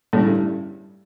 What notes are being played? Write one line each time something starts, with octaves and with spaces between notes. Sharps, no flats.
A2 D3 G3 C#4 E4
G2